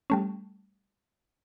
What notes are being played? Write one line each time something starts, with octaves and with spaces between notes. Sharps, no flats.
G3 A3 C#4